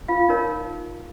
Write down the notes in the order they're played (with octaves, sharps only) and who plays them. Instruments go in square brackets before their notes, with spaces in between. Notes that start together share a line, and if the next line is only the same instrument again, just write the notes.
[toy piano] F4 F5
D#4 A#4 C#5